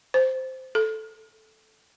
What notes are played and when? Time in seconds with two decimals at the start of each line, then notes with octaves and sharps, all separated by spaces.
0.14 C5
0.75 A4